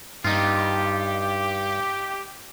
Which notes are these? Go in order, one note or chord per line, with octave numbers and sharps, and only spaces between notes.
G2 D#4 F4 G4